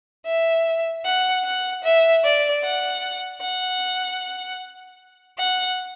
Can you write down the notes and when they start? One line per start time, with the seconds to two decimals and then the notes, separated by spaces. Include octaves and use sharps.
0.26 E5
1.05 F#5
1.45 F#5
1.84 E5
2.24 D5
2.63 F#5
3.42 F#5
5.38 F#5